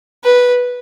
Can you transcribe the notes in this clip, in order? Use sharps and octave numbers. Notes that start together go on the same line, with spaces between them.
B4